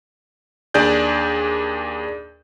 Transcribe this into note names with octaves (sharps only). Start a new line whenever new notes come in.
D#2 D4 G#4 D5 G6